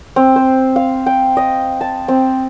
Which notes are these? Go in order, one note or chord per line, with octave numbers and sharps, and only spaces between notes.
C4
C5
F5
G5
D#5
A5
C4